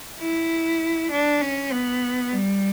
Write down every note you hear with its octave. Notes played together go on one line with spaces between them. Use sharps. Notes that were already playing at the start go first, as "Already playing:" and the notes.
E4
D4
C#4
B3
G3